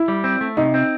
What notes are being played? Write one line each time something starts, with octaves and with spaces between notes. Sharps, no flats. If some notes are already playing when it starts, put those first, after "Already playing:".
Already playing: E4
G3
C4
A3
C3 D#4
C4